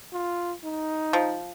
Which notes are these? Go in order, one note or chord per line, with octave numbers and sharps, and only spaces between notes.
F4
D#4
F3